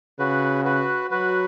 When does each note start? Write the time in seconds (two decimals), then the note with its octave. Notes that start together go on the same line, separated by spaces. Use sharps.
0.19 C#3 F#4 B4
0.65 F#4 B4
1.11 F#3 F#4 B4